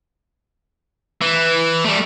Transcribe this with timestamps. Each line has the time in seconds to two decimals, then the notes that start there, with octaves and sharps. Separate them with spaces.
1.21 E3
1.85 G3 A3